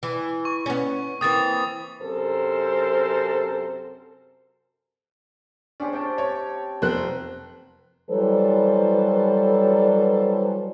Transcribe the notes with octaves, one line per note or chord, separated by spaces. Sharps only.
E3
C#6
B3 C#4
E3 A#3 C4 D#6 A6
F#2 C3 A4 A#4 C5
C#4 D4 G4 C5
C3 C4 G5 A5
C#5
F1 C5 F#6
E3 F#3 G3 A4 B4 C5